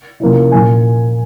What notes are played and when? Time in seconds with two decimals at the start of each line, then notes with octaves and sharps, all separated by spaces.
0.20 C3 F3 A#3 C#4 E4
0.52 A#2 F3 A#3 G#5